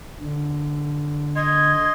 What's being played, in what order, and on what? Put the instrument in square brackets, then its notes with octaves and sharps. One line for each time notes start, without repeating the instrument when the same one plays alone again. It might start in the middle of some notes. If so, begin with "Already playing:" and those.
[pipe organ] D3
[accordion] D#5 C6 [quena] G#6